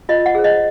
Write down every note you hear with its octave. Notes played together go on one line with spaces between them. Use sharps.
F4 D#5
F#5
G#4 C5
D#5